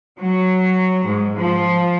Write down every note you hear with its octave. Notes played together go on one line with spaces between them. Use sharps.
F#3
G#2
F3